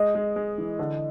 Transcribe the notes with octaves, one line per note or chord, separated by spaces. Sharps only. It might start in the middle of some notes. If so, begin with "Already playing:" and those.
Already playing: G#3 D#5
G#3
G#3
E3
D3